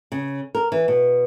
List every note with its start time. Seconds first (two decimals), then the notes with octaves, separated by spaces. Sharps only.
0.12 C#3
0.55 A#4
0.72 E3
0.88 B2